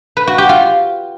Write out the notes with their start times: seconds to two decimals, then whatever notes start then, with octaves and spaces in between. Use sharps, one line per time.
0.17 B4
0.27 F#4
0.38 G4
0.49 F4